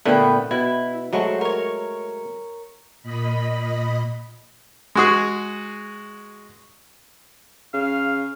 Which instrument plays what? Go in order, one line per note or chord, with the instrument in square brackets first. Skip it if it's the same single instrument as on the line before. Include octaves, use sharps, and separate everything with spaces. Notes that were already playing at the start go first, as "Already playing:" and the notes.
[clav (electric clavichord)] A#2 D3 A3 [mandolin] B3 B4 G5
[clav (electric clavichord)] B2 [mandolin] E4
[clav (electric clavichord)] F#3 G#3 A3 [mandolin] F#4 C5 C#6
[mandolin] A#4 C#5
[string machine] A#2 D#5 B5
[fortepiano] G#3 F#4 G#4
[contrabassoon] C#3 [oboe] F5